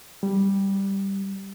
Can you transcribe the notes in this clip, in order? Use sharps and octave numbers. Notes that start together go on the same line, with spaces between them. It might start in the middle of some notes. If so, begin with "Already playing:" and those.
G3